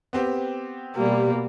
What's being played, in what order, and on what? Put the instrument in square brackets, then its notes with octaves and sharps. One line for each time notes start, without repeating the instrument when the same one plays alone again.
[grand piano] B3 C4 G4
[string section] B2 G3 [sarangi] A#3